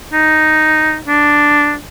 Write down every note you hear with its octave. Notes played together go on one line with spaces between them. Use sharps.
D#4
D4